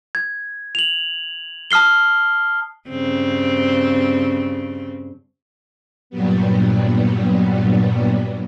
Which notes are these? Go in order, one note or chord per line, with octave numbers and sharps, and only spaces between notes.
G#6
F7 F#7
A5 D#6 F6 C7 G7
G2 C#3 C4
G2 A#2 F#3 G3 B3